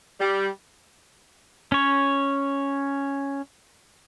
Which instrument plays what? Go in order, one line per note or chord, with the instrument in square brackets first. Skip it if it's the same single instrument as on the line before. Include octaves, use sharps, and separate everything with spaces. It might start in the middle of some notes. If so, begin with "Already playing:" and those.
[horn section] G3
[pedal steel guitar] C#4 C#5